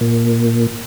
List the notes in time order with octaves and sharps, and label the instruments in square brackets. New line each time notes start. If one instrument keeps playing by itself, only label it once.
[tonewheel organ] A#2